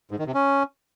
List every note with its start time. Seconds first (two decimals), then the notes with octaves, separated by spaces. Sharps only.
0.11 G#2
0.19 D#3
0.27 C3
0.34 C#4